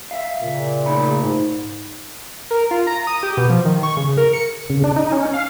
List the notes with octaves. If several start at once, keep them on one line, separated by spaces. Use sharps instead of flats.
E5 F5
A#2 C#3
A2 D#4 B5
G#2
A#4
F4
A#5
D#6
G4
B2
F3
D#3
C#6
C#3
A#4
C#7
C#3
D4
D#4
C#4
F5